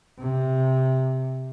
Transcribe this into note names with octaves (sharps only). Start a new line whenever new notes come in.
C3